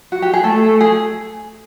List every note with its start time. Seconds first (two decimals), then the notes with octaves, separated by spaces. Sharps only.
0.12 F#4
0.22 G4
0.33 G#4
0.43 A3 A4
0.81 G#4